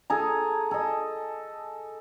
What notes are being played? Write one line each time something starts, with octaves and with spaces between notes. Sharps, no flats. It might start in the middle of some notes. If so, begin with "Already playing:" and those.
G#4 A4 A#5
A4 D#5